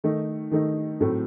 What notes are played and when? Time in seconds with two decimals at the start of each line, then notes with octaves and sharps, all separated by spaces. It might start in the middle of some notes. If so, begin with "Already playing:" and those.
0.04 D#3 A3 D#4
0.51 D#3 A3 D#4
1.00 A2 F#3 A3 C4